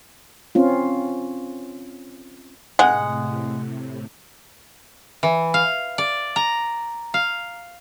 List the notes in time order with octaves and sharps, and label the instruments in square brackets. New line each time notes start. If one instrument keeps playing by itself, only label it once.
[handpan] C4 C#4 F4
[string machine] A2 C3 [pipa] G#3 [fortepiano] F#5
[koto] E3
F5
D5
A#5
F5